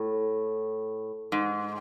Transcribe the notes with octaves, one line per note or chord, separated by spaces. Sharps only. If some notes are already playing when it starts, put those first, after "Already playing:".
Already playing: A2
G#2